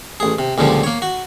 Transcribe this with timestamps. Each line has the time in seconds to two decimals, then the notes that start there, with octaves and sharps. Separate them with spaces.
0.20 A1 G#4
0.39 C3
0.58 C#2 A#2 D3 F3 G3
0.83 A#3 C#5
1.02 F#4